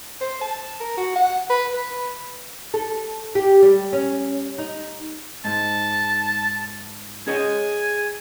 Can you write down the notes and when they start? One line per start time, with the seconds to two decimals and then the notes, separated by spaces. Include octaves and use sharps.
0.21 C5
0.42 A5
0.80 A#4
0.97 F#4
1.16 F#5
1.50 B4
1.74 B4
2.74 A4
3.35 G4
3.62 G3
3.93 C#4
4.58 D#4
5.45 G#2 A5
7.28 G#4 C#5 D#5 G#5